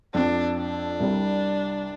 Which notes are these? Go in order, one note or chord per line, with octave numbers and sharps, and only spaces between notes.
F2 F3 C4 D4
D4
C2 C3 G3